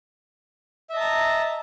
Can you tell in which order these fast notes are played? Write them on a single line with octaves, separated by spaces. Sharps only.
E5 D#5 A5 A#5